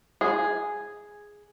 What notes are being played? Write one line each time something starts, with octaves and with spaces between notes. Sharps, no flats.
G#4